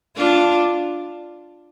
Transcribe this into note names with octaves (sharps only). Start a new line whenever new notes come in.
D4 F4